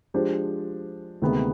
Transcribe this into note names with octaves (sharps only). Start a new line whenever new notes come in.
F3 G#3 D4 G4 C5
D2 C3 D#3 G#3 B3